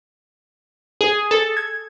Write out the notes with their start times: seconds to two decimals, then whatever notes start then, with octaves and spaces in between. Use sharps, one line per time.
1.01 G#4
1.31 A4
1.57 G#6